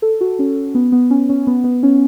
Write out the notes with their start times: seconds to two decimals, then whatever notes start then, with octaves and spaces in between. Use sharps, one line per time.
0.02 A4
0.21 F#4
0.39 C#4
0.75 B3
0.92 B3
1.11 C#4
1.29 C#4
1.47 B3
1.64 B3
1.83 C#4